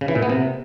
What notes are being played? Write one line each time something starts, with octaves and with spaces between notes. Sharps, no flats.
C#3
E3
A#2
B3
C3